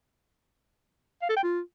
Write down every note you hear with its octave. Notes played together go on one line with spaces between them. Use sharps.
F5
A4
G5
F4